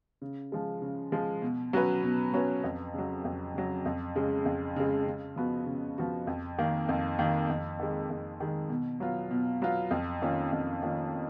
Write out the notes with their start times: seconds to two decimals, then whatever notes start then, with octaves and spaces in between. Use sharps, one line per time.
0.22 C#3
0.52 F3 G#3
0.82 C#3
1.12 F3 G#3
1.42 B2
1.73 F#3 C#4 F#4 B4
2.03 B2
2.34 F#3 C#4 F#4 B4
2.64 F2
2.94 C#3 F#3
3.25 F2
3.54 C#3 F#3
3.86 F2
4.15 C#3 G#3
4.46 F2
4.76 C#3 G#3
5.07 C#3
5.36 F3 B3 F#4
5.66 C#3
5.98 F3 B3 F#4
6.27 F2
6.58 D#3 A#3
6.89 F2
7.19 D#3 A#3
7.49 F2
7.79 D#3 G#3
8.10 F2
8.40 D#3 G#3
8.70 B2
9.00 F#3 B3 F4
9.31 B2
9.62 F#3 B3 F4
9.91 F2
10.22 D#3 A#3 C#4 F4
10.52 F2
10.83 D#3 A#3 C#4 F4